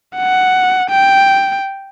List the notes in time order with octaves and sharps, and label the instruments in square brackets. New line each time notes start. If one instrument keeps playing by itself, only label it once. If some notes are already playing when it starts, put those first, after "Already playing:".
[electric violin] F#5
G5